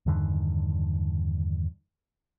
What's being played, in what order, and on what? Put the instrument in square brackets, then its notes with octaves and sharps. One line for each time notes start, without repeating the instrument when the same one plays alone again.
[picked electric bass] E2 G2 D3 D#3